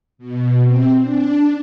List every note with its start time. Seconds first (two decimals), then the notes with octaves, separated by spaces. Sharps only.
0.18 B2
0.63 C4
1.01 D4